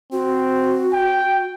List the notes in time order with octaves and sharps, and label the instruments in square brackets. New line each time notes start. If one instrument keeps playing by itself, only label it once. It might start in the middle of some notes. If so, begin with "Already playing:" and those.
[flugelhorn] C4 [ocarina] F#4
[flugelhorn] G5